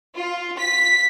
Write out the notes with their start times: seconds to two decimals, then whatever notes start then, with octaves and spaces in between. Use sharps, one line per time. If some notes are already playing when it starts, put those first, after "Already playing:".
0.15 F4
0.58 B6